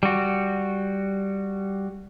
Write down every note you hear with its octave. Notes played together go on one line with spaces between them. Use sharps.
G3 F#4